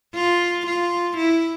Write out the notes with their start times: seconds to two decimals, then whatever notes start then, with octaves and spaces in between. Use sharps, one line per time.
0.15 F4
0.66 F4
1.17 E4